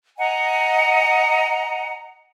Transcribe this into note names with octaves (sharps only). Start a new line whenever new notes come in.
D#5 F#5 G#5 A#5